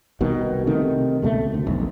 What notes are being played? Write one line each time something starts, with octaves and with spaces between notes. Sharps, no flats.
C2 B2 D#3
C3 D#3 A3
C#2 B2 F3 A3
D2
F1 B1